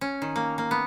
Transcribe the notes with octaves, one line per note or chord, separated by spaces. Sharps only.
C#4
D#3
A#3
A#3
B3